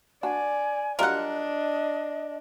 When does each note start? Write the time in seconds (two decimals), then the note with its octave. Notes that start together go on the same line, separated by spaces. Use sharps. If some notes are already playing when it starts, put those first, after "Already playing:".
0.23 D4 F#4 D5 G#5
0.99 F#3 G3 D4 F4 A#4 D#5 F#5